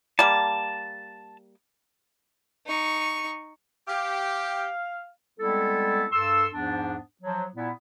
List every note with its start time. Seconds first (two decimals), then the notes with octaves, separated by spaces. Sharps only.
0.19 G3 A#3 A5
2.66 D#4 C#6
3.88 G4 F5
5.39 G3 G#3 B3 C4 E4 A4
6.13 G2 A4 C6 E6
6.53 E2 G#2 F3 B3 D4
7.22 F3 F#3
7.56 A#2 B3 E4